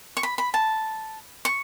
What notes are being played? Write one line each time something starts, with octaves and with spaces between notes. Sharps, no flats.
C#6
B5
B5
A5
C#6